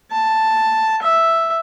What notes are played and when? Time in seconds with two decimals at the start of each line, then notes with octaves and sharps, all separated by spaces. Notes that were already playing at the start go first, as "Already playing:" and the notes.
0.11 A5
1.02 E5